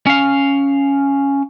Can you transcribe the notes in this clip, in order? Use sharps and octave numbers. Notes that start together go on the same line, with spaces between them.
C#4 F5